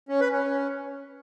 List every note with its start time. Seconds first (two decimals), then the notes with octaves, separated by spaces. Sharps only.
0.09 C#4
0.21 B4
0.32 C#4